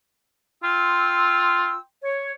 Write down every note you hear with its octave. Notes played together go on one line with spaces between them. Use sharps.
F4 G5 C6 E6
C#5